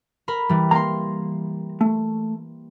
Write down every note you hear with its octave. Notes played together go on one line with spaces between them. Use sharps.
A#4 A#5 B5
E3 G3
A#3 A#5 C6
A3